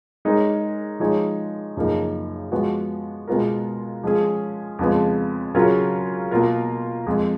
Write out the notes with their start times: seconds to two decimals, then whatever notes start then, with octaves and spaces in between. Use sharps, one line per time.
0.25 G#3 D#4 A#4 C#5
1.00 F3 G#3 D#4 G#4 C#5
1.77 F#2 C#3 F3 A#3 D#4
2.52 F3 G#3 B3 F#4
3.28 B2 G#3 B3 F4 A#4
4.03 F3 G#3 C#4 G#4 C#5
4.79 F2 C#3 F3 G#3 B3
5.55 C#3 F#3 C#4 F4 A#4
6.31 B2 A#3 F4 A#4
7.06 F2 F3 G#3